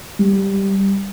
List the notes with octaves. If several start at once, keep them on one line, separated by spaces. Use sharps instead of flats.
G3